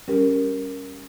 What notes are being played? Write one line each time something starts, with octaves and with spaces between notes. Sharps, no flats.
G3 C#4 G4 A#4